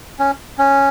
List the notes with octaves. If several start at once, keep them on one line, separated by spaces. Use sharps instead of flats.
C#4
C#4